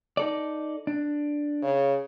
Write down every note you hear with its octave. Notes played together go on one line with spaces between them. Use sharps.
D#4 A4 D5
D4
C#3